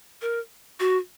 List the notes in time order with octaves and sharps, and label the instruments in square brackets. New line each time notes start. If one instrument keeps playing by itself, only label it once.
[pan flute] A#4
F#4